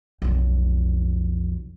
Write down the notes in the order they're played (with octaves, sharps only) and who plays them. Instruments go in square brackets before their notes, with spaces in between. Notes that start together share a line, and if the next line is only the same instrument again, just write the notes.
[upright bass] B1 F2